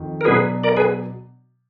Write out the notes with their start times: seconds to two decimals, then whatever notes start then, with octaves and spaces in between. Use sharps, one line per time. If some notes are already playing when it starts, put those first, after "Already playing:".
Already playing: F2 D#3
0.21 A#4
0.25 B2 F#3 D4 G#4 B4
0.64 A#4 D5
0.77 G#4 B4